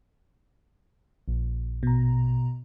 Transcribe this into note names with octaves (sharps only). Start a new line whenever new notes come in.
A#1
B2 A#5